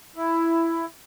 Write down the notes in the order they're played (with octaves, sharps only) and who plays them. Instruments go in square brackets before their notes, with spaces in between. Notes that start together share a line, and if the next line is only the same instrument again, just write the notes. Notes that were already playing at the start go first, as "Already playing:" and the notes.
[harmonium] E4